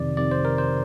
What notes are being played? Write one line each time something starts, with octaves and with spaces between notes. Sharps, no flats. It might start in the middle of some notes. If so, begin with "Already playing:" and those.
Already playing: F2 C3 D#3 D5
F2 C3 D#3 D5
C5
A#4
C5